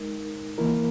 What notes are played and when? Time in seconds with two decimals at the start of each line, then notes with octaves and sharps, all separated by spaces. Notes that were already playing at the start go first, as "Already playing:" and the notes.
Already playing: G#3 D#4 A#4
0.58 E3 A#3 E4 A#4